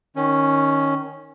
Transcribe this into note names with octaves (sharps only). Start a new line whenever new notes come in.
D#3 C#4